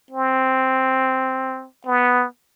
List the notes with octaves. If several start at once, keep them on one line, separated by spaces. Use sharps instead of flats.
C4
B3